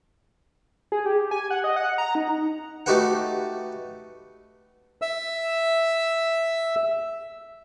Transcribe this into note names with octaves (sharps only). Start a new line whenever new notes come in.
G#4
G4
G#5
F#5
D#5
F#5
A#5
D#4
A3 D#4 F#4 G4 B4 F#5
E5 E6